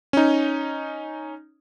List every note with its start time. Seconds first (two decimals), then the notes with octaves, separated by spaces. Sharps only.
0.13 C#4 D#4